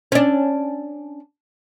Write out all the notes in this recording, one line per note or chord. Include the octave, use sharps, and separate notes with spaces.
C#4 D4